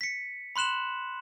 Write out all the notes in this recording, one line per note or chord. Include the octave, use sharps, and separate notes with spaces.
B6 C#7
B5 C6 F#6 E7 F#7